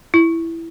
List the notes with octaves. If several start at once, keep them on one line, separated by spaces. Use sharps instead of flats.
E4